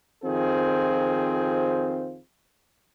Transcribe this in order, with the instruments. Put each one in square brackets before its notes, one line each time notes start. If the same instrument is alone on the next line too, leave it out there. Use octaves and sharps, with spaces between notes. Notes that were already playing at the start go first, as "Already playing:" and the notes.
[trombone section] F2 D#3 C4 F4 G#4 C5